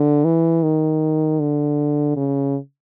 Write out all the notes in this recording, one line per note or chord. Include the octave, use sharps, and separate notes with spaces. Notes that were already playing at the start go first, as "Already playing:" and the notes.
Already playing: D3
E3
D#3
D3
C#3